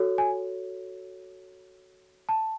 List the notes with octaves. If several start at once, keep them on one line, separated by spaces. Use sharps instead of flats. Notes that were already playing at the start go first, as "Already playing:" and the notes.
Already playing: F#4 A4 C#5
G#5
A5